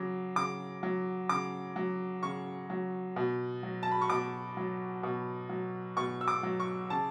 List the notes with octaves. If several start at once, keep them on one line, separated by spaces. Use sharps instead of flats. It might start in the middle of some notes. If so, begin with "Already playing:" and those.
Already playing: C#3 F#3 D6
C#3 D6
F#3
C#3 D6
F#3
C#3 C#6
F#3
B2
F#3
A5
B5
C#6
B2 D6
F#3
B2
F#3
B2 C#6
E6
D6
F#3
C#6
C#3 A5